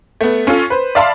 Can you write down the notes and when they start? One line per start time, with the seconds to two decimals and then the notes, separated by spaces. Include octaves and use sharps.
0.21 A3 B3
0.47 C#4 F4 A4
0.70 B4 C5
0.95 D5 E5 F5 A5 B5 C6